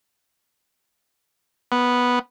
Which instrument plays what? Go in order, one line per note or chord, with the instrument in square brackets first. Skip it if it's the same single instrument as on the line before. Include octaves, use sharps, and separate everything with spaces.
[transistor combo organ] B3